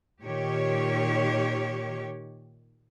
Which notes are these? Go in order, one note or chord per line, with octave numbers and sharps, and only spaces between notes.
A#2 D#3 G4 C#5